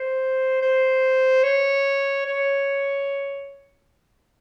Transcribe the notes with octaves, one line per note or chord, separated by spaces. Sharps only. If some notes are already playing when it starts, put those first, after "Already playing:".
Already playing: C5
C5
C#5
C#5